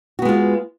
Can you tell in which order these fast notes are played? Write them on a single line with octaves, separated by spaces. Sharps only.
F#4 B3 G#3 F4